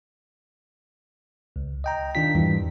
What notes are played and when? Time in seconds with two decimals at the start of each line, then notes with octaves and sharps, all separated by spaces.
1.56 C#2
1.84 D#5 G5 A#5
2.15 D#3 D4 F4 B6
2.35 E2 G#2 E3 G3